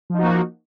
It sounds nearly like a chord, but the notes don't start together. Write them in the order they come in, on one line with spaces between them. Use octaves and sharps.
F3 D#4 F#4 A#3